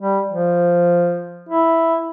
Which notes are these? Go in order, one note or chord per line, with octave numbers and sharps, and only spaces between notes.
G3
F3
E4